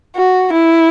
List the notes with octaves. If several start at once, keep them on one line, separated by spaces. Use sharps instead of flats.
F#4
E4